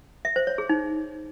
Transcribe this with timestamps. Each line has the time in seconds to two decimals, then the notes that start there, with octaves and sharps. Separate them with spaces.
0.25 E5
0.36 C5
0.47 C#5
0.58 G#4
0.69 D#4